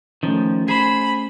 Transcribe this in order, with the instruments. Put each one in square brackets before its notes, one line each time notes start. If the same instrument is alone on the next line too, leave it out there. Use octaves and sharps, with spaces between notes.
[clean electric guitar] D#3 F3 [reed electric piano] A3 C#4
[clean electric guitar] G#4 C5 [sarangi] B5